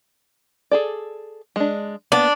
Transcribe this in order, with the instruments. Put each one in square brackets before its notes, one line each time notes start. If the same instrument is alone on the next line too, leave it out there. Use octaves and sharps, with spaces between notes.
[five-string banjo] G#4 A4 D5
G#3 D4
[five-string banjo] A#3 B3 [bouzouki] D4